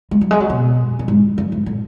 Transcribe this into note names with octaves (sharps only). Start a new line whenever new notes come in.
G#3
F#3
G#3
F#3
B2
E2
F#2
G#2
F#2
G#2
A2